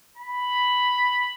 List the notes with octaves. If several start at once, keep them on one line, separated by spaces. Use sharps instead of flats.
B5